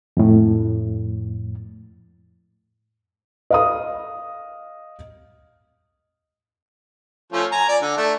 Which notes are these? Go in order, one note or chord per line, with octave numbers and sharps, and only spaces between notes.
F2 A2
D#5 F5 D#6
F3 A3 C#4
G#5 A#5
D5
D3
A3 D4